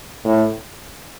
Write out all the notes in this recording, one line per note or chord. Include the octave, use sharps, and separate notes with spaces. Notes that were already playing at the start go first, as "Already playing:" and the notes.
A2